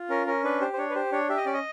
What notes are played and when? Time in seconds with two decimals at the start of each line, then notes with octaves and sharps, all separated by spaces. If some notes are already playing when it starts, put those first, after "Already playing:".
Already playing: F4
0.09 C#4 A#4
0.27 C#4 A#4
0.44 D4 B4
0.61 G4 C5
0.73 C5
0.78 D4 C#5
0.90 B4
0.95 G4 C5
1.12 D4 C#5
1.29 G4 E5
1.37 D#5
1.46 C#4 D5
1.53 D#5